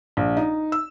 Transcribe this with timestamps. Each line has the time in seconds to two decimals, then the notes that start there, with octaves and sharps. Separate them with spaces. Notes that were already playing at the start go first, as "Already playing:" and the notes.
0.17 A#1
0.37 D#4
0.72 E6